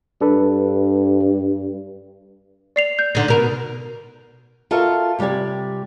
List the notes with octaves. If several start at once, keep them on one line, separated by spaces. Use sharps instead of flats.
G2 D4 A4 B4
D5 C7 F7
G6
D3 D#4
B2 A#4
F4 F#4 A4 A#4 E5 F5
C3 G3 G4 D5 G#5